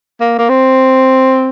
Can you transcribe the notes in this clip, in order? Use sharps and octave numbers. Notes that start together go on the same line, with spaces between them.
A#3
A#3
C4